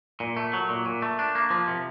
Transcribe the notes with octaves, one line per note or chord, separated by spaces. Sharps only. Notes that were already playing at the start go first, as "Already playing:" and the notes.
A#2
A3
F#3
A#2
A#2
A3
D4
A#3
F3
C3